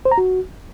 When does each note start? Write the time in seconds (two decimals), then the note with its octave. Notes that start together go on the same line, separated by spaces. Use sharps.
0.05 C5
0.11 A#5
0.18 F#4